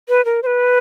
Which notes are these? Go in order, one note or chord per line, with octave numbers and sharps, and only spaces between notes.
B4
A#4
C5
B4